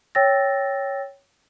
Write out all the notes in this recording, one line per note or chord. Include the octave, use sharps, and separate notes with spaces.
C#5 G5 E6 A6 A#6